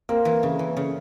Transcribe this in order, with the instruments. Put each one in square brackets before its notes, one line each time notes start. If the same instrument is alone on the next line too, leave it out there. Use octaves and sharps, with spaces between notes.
[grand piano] A#3 [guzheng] C4
[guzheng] E3
C#3
E3
C#3